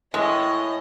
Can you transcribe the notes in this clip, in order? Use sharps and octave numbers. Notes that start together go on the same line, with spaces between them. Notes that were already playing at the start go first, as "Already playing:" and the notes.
A2 G#3 D#5